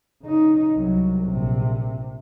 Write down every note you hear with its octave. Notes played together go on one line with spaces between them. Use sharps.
C#3 D#4
C2 F#3
A#1 C3